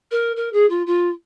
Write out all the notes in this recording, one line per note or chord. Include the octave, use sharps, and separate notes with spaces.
A#4
A#4
G#4
F4
F4